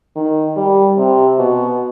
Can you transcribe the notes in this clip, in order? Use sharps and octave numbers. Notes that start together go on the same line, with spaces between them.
D#3
G3
C3
B2